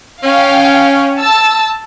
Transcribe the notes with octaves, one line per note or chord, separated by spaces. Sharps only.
C#4 F5 G5
A5 E6